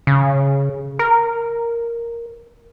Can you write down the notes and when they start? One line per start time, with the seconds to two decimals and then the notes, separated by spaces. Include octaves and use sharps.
0.07 C#3
0.99 A#4